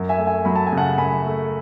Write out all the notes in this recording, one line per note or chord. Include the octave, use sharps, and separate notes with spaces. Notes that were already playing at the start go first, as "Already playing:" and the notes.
Already playing: F#2
E5 G#5
A3
E5 G#5
F#3 B5
A5
G#5
C#3
F#5 A5
F#2 G#5 B5
A3